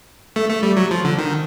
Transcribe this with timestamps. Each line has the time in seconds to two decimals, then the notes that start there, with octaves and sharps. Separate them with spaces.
0.36 A3
0.50 A3
0.63 G3
0.77 F#3
0.91 F3
1.04 D3
1.18 D#3